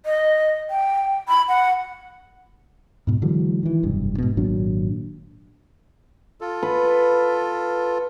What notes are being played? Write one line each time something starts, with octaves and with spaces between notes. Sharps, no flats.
D#5
G5
B5
F#5
G#2 B2
D3 E3 F#3 G#3
D#3 E3
F1 B1 G2
G#2 B2
G#1 A#2 F#3 D4
F4 A4
B4